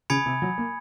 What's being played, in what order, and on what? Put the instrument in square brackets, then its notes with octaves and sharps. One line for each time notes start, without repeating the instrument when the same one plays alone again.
[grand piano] C#3 [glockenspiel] G#5 B5 D#6 G#6 C#7
[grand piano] C3
F#3
A#3